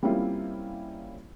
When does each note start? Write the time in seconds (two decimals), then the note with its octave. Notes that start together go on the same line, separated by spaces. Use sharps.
0.03 G3 A#3 C4 C#4 E4 F4